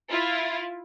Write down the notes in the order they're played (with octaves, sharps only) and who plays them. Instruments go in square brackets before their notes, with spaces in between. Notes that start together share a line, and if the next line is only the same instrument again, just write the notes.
[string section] E4 F4